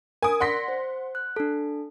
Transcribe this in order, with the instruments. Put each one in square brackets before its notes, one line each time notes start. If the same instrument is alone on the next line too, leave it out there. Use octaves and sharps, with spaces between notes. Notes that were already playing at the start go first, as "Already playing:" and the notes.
[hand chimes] A#4 D7 [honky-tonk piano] G#5 D#6
[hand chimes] D5 A#6 [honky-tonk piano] F#5 C6 B6
[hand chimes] C5
F#6
D4 A4